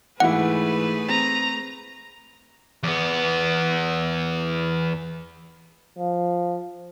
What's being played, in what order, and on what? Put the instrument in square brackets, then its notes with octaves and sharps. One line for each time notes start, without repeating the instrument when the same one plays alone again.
[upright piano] G#2 E3 E4 [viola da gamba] A3 G#4 B4 [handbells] F#5
[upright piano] C4 [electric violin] A#5
[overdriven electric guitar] E2 B3
[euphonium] F3